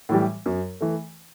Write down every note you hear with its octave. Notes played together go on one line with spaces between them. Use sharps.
A2 E3 G3
F#2
E3 A3